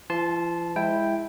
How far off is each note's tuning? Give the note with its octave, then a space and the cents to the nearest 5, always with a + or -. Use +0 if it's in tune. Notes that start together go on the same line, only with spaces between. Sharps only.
F3 -45 A5 -15 C6 +0
G#3 -15 E4 +0 G5 +0